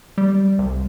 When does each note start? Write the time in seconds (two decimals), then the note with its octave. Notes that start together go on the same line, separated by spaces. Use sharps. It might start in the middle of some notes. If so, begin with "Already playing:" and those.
0.18 G3
0.59 C2